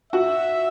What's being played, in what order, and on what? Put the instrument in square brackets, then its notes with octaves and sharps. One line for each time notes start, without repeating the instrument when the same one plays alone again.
[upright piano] F#4 [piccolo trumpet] E5